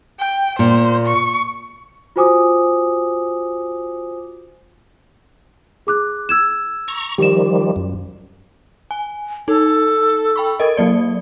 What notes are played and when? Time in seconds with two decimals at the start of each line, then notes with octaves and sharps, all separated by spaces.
0.19 G5
0.59 A#2 C5
1.06 C#6
2.16 F4 F#4 C5 G#5 D6 D#6
5.87 G#4 D6 F#6
6.29 E6 G#6 E7
6.88 A#5 C#6
7.18 D#3 F3 G3 G4 E7
7.76 F#2
8.91 G#5
9.48 D#4 A4
10.36 G5 B5 C#6
10.60 A4 A#4 D#5
10.77 F#3 A#3 D5